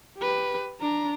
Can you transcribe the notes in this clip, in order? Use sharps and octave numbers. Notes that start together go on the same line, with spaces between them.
G4 B4
D4 A#5